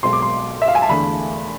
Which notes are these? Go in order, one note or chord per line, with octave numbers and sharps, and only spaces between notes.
B1 B2 G#3 C4 C6
D6
C6
E5
F5
G#5
A5
E2 D3 A3 B5